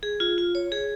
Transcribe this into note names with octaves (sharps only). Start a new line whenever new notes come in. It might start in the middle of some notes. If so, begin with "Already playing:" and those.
G#4
F4
F4
C#5
G#4